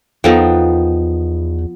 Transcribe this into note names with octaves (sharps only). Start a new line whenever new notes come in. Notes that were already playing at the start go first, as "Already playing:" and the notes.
E2 F3 B3 D#4 A4 G5